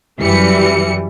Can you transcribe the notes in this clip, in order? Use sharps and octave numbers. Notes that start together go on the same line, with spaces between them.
F#2 E3 G3 C#7